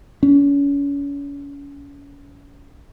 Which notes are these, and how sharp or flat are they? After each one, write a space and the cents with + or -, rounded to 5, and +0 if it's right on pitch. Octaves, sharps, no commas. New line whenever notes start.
C#4 +35